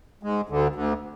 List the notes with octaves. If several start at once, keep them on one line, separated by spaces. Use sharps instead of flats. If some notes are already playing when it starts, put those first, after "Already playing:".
G#2 G#3
D2 D3
D2 D3